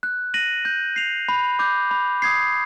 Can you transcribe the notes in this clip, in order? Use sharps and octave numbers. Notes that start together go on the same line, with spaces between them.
F#6
A#6 D#7 F#7
G6
C7 F7
B5
D6 G6
B5
D#6 G#6 C7